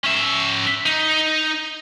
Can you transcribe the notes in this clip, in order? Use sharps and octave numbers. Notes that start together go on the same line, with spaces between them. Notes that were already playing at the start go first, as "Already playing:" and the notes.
C#4 E5
D#4